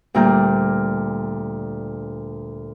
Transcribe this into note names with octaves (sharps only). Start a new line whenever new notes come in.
D2 A#2 G3 A#5 F6 G6